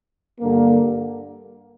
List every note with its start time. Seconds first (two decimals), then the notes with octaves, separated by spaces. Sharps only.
0.40 G2 D3 A#3